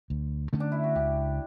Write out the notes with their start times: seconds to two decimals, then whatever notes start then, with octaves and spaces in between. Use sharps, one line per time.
0.10 D2
0.53 D3 A3 C#4
0.60 D4
0.72 E4
0.84 F#4
0.95 C#2 G4